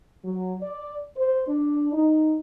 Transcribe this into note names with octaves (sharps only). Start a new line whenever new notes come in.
F#3
D5
C5
D4
D#4